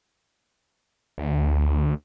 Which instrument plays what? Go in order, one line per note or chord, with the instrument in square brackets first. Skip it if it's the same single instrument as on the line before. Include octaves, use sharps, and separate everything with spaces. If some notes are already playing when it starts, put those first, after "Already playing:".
[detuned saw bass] D2